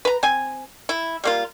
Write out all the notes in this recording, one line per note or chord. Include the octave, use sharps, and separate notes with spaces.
B4 A#5
C4 G#5
E4
G3 A#3 F4